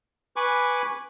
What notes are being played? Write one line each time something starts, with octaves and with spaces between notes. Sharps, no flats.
B4 G#5 B5 C#6 D6